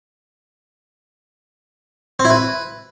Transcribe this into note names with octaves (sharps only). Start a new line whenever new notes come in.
C4
E4
B4